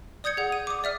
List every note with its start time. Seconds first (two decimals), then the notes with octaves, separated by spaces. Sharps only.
0.24 D5 D#6 G6 G#6 C#7
0.37 G#4 F#5
0.52 D#7
0.67 D6 D#6
0.84 D5 E5 F6